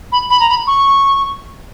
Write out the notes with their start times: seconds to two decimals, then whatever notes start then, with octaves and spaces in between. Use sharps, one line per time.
0.12 B5
0.30 B5
0.40 A#5
0.49 B5
0.67 C#6